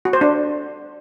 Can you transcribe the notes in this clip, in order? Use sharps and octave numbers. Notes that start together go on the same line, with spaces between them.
F#4
C5
D4